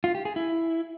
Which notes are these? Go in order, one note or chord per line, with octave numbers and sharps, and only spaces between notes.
F4
G4
G#4
E4